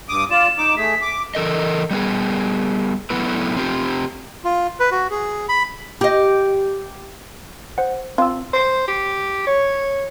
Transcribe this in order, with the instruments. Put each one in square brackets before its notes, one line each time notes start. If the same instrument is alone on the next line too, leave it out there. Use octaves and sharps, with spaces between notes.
[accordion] G2 D6 D#6
[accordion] F4 D5 [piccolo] E7
[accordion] D#4 D6
[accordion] A3 G#4 [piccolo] B6
[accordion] D6
[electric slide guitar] E3 A4 A#4 D#5
G3 B3 G#4
F#3 A3 B3 E4 B4
C4 F4 G4
[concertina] F4
B4
F#4
G#4
B5
[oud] G4 D#5
[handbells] C5 F#5
[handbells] C4 E6 [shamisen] F4
[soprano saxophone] C5
G4
C#5